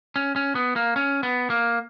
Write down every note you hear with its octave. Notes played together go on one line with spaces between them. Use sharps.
C#4
C#4
B3
A#3
C#4
B3
A#3